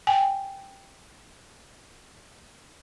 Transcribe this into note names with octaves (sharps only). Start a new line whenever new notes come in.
G5 G#5